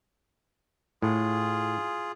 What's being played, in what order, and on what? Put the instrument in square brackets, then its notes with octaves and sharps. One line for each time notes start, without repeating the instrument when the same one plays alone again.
[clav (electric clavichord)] A2 [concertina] F4 G#4